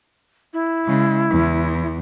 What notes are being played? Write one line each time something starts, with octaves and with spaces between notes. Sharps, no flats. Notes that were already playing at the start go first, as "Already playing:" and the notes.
E4
C#3 G#3
E2